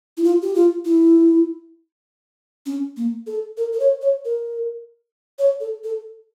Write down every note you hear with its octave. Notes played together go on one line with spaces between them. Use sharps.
E4
F4
G4
F4
E4
C#4
A#3
A4
A#4
A#4
C#5
C#5
A#4
C#5
A4
A4